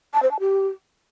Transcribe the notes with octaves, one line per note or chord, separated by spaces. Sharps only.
A5
C5
A5
G4